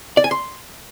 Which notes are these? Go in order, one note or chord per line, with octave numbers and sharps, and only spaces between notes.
D5
G#5
C6